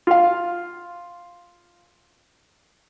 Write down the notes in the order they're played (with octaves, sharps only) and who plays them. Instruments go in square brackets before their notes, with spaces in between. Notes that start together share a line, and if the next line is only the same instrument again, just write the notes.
[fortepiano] F4 F5